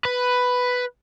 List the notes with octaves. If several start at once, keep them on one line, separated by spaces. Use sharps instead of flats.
B4